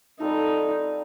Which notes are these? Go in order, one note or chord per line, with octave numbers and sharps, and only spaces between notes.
G3 C4 D#4 F4 A4